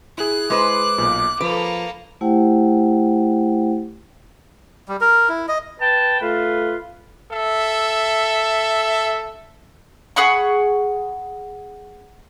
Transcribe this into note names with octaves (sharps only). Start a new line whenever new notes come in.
E4 G#4 F#6
G#3 B4 C5 D6
B1 A#2
F3 A#3 A4 B4 D7
A3 E4 G4 C5 F#5 G5
G3
A#4
E4
D#5
B4 G5 A5
A3 F4 B4
A4 E5
G#4 F#5 B5 C#6